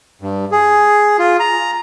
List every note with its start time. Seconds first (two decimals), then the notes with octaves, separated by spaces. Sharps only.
0.21 G2
0.52 G#4
1.19 F4
1.40 A#5